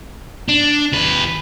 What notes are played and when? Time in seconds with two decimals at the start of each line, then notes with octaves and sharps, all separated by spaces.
0.48 D4
0.92 D#2 B4